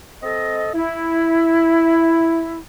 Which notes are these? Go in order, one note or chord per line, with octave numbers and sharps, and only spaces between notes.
C4 A4 D#5
E4